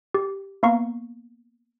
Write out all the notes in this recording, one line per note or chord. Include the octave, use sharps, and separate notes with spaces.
G4
A#3 B3 F5 A#5 C#6